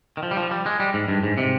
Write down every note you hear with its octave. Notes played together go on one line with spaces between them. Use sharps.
D#3
F3
G3
F3
G3
G#3
G3
G#2
G2
G#2
C3